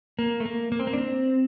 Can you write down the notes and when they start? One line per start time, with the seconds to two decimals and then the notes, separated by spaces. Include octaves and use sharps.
0.19 A#3
0.40 A3
0.46 A#3
0.72 A#3
0.79 C4
0.87 A#3
0.93 D4
0.98 C4